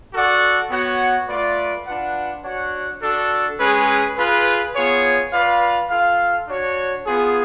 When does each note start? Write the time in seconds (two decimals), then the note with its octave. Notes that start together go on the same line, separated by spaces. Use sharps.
0.14 F#4 A4 D5 F#5
0.71 B3 F#4 C#5 F#5
1.28 A3 F4 B4 D5
1.87 D4 F4 B4 F#5
2.44 D4 F#4 C#5 F#5
3.02 D4 F#4 A4
3.59 G#3 C#4 G#4 B4
4.17 F4 G#4 B4
4.76 B3 F4 G#4 C#5
5.32 F4 B4 D5 F5
5.90 F4 A4 F5
6.48 D4 F#4 C#5
7.05 B3 F4 G#4